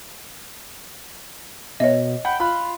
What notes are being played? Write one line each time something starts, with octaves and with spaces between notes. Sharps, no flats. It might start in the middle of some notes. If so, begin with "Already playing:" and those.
B2 C#5 D#5 E5
F#5 G5 B5
F4 B5 F#6